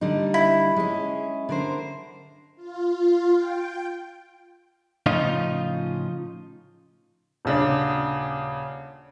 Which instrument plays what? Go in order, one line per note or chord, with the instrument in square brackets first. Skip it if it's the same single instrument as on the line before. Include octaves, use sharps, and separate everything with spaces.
[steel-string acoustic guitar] D3 G3 D#4
[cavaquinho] E4
[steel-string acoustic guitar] G#3 C#4
D3 A#4 C5
[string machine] F4
G5
[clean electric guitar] A2 C#3 F3 D#4 F4
[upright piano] D#1 C#3 D4